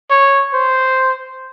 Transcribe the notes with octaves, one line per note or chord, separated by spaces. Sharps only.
C#5
C5